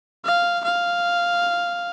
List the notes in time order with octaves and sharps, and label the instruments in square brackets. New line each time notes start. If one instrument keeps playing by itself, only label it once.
[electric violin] F5
F5